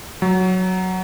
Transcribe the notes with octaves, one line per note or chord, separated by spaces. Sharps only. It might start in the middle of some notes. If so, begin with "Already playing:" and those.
F#3